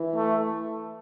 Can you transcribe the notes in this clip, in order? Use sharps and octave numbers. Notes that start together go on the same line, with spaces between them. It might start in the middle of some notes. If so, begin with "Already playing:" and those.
Already playing: E3
A3